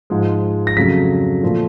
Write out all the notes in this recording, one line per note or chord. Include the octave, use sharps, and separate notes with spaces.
G#2 F3 G#3
A#6
F2 C#3 F#3 A3 B6
A#2 F3 A3